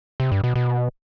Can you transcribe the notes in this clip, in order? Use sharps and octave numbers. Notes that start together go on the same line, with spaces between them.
C3
G2
B2
B2